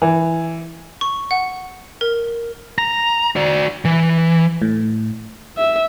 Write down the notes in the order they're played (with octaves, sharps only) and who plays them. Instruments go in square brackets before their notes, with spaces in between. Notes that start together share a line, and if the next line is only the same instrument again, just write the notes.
[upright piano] E3
[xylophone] C#6
F#5
A#4
[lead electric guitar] A#5
F#4 D5
E3
[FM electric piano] A2
[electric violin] E5